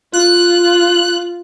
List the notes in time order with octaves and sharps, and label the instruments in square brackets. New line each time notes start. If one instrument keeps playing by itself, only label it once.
[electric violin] F4 [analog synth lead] F#6